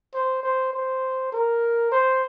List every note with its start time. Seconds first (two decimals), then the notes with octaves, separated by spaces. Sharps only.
0.14 C5
0.43 C5
0.73 C5
1.32 A#4
1.92 C5